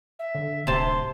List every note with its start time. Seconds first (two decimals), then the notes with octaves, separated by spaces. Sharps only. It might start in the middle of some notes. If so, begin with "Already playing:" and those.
0.19 E5
0.35 D3
0.67 D1 C3 A5 C6